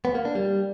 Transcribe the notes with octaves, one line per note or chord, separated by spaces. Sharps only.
B3
A#3
D4
G3